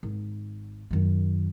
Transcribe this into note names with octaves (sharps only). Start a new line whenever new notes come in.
G#1
F#2 D#3